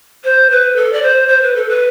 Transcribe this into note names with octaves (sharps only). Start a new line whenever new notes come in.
C5
B4
A4
D5
C5
C5
B4
A4
B4